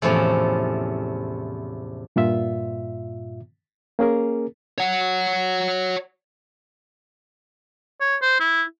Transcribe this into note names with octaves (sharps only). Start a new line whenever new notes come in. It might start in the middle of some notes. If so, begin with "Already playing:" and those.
E2 A2 C3 F3 C#4
G2 A#2 F4 E5
A#3 C#4 G#4 A#4
C#5 F#5
C#5
C5
E4